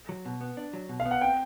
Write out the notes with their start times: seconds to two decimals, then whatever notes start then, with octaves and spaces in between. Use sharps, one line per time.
0.09 F#3
0.25 B2
0.41 B3
0.57 D4
0.73 F#3
0.89 B2
1.00 F5
1.05 B3
1.11 F#5
1.21 C4 G5